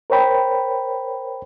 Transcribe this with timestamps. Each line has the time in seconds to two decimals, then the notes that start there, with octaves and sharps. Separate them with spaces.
0.10 A#4 C5 C#5 G5 B5